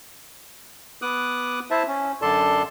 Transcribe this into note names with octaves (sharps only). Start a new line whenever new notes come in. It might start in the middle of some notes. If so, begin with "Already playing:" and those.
B3 D6 D#6 F#6
E4 C5 E5 A5
C#4
F#2 D3 A4 D5 A5 C6